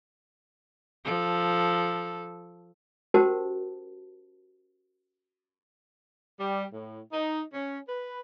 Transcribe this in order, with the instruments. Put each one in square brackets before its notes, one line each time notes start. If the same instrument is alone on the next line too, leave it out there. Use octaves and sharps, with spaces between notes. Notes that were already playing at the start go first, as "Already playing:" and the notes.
[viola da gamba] F3 A4
[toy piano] C#4 F#4 G4 A#4 C5 A5
[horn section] G3
A2
D#4
C#4
B4